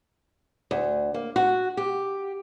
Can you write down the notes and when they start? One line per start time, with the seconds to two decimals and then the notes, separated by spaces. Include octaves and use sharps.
0.71 D2
1.14 A#3
1.36 F#4
1.77 G4